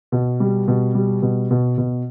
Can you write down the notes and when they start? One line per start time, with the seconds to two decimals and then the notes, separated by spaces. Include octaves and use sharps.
0.12 B2
0.40 G3
0.68 B2
0.95 G3
1.22 B2
1.51 B2
1.78 B2